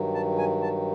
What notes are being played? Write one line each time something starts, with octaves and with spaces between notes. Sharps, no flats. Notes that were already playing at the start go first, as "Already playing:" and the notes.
Already playing: G2 D#3 F#3
A5
G#5
A5